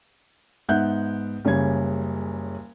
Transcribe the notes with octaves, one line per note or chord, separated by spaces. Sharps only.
G#2 B3 E5 F#5 F#6 G6
F#1 C#3 G3 C#4 G#6